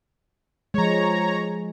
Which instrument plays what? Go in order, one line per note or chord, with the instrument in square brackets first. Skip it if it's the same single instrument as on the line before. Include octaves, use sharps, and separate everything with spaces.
[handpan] F3 G#3 [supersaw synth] C#5 A#5